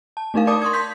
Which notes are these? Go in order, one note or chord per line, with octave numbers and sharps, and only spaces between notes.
A5
A3 D4 D#4 A#4 F5
A#4 D5 A5 D6 D#6
C6 C#6 D#6 G#6
C6 G6 B6